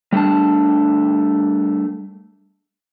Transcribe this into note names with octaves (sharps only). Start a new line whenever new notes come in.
G3 A3 D4 A5